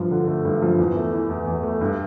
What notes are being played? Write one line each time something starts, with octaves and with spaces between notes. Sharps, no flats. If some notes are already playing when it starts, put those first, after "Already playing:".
Already playing: G2 F3
D3
A3
G2
F3
E2
A3
E3
E2
E2
A3
G2